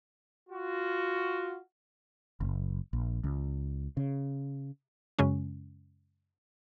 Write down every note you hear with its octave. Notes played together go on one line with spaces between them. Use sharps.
F4 F#4
F#1
A#1
C#2
C#3
F#2 C#3 G#3 C#4